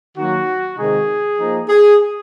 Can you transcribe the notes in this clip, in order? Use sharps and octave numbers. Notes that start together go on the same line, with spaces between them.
D#3 F#3 A#3 F#4
C3 D#3 G#3 D#4 G#4
F3 A#3 D#4
G#4